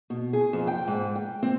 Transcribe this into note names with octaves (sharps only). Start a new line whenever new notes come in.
B2
G#4
F2
G5
G#2
G5
C4